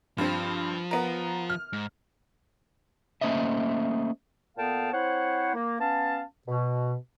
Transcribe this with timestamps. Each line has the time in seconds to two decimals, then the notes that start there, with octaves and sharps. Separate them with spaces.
0.18 G2 F3 C4
0.91 B3 A#4
1.50 F6
1.73 G#2
3.21 A3 A#3 C#4 C5 D#5 E5
4.57 A#2 B3 A4 F5 G5 A5
4.93 C4 E4 C5 C#5 F#5
5.55 A#3
5.80 B3 C#4 F5 A5
6.48 B2